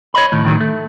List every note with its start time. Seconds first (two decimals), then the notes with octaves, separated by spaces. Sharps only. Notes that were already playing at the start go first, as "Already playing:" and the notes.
0.14 C#5 D#5 B5
0.32 A2 D#3
0.45 A2 D#3 F3 F#3
0.61 A3